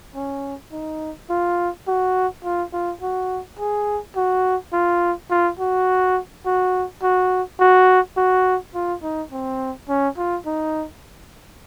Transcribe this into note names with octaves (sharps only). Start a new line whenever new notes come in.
C#4
D#4
F4
F#4
F4
F4
F#4
G#4
F#4
F4
F4
F#4
F#4
F#4
F#4
F#4
F4
D#4
C4
C#4
F4
D#4